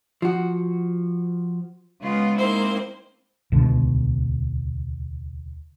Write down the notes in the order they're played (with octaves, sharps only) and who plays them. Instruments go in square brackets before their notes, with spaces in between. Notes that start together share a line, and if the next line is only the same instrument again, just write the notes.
[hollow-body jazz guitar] F3 F#4
[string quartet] C#3 G#3 B3 F4
G#3 A#3 C4 D#4 E4 C5
[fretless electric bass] D#1 C#2 B2 D3